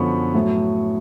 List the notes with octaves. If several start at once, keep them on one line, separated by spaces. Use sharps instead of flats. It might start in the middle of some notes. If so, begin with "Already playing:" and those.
Already playing: F#2 D3 F3 B3 C#6
A2 F#3 A3